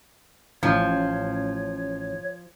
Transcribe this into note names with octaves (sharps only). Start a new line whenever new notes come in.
A1 F3 C#5